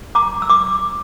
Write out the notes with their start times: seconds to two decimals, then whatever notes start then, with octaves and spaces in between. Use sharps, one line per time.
0.15 A#5 D6
0.42 E6
0.50 D6